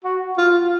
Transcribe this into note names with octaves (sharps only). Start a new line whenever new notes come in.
F#4
F4